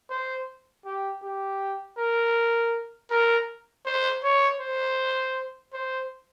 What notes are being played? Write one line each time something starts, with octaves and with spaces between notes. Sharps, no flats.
C5
G4
G4
A#4
A#4
C5
C#5
C5
C5